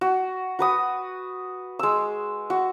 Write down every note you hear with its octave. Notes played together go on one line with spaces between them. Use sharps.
F#4
F#4 B4 D#6
G#3 E6
F#4